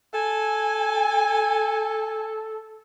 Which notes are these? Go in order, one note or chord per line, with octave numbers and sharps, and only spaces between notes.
A4 G#5